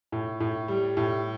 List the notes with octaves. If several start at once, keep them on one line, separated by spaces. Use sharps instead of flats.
A2
A2
G3
A2